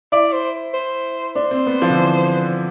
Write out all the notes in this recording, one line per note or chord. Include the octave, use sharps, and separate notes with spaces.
E4 D5
C5
C5
D4 C5
C4
B3
F3
D3
E3